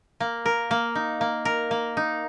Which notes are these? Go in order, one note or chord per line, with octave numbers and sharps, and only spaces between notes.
A#3
A#4
A#3
D#4
A#3
A#4
A#3
D#4